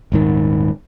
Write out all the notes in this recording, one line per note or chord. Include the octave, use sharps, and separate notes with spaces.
D#1 G#2 D#3